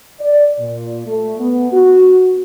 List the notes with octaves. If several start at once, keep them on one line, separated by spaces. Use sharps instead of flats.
D5
A#2
A3
B3
F#4